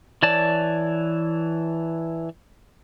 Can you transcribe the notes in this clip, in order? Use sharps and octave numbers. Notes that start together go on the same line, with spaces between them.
E3 C#5 D5 A5